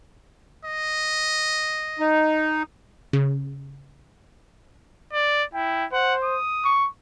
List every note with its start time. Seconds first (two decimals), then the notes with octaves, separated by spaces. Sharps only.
0.65 D#5
1.99 D#4
3.13 C#3
5.13 D5
5.54 E4 G5
5.92 C5 F#5
6.24 D#6
6.65 C#6